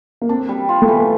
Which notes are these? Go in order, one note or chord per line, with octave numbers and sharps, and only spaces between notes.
A#3
C4 D4
G3
F4
A3
E3